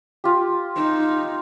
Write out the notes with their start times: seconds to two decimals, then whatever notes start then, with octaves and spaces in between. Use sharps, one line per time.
0.24 F4 G4
0.76 D#4